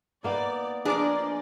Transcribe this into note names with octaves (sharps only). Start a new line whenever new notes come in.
A#3 B3 D#4 D5
F3 D4 G#4 A#4 D5 D#5 D6